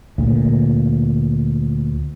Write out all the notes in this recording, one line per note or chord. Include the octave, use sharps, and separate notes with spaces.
D2 A#2